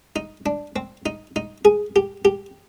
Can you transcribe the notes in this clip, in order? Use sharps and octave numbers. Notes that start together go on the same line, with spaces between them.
D#4
D4
C4
D#4
D#4
G#4
G4
G4